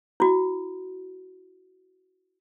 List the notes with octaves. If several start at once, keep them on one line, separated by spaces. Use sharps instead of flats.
E4 F#4